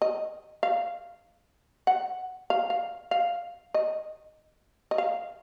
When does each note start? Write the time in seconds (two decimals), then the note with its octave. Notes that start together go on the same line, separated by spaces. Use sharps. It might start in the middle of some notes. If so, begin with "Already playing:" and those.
0.02 D#5
0.63 F5
1.87 F#5
2.50 F5
2.70 F5
3.11 F5
3.74 D#5
4.91 D#5
4.98 F5